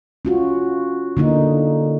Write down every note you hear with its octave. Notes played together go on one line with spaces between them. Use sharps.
C#4 F4 F#4
D3 A#3 D#4